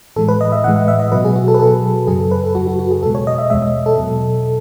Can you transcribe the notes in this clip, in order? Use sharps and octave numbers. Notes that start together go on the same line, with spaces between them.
A2 E3 G#3 A4
B4
D#5
E5
A2 E3 G#3 F#5
F#5
E5
D#5
B2 F#3 B4
G#4
F#4
A4
B4
B2 F#3 A4
F#2 C#3 F#3 G#4
A4
B4
A4
F#2 C#3 F#3 F#4
F#4
F#4
G#4
E2 B2 G#3 A4
C#5
D#5
E5
E2 B2 G#3 E5
E5
A4
B2 F#3